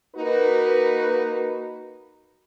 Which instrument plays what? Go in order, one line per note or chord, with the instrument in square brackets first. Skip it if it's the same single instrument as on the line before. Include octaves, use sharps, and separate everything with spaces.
[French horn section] A#3 D#4 F#4 B4